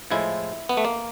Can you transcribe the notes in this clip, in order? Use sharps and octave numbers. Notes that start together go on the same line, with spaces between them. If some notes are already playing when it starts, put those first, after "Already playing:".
A2 F3 G#3 E4
B3
A3
A#3